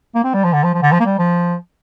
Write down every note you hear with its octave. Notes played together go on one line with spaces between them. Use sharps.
A#3
C4
G3
F3
D3
F3
F3
D3
F3
A#3
G3
F3